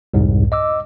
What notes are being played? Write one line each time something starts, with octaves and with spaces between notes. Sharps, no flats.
C2 F2 G#2
D#5 D6 E6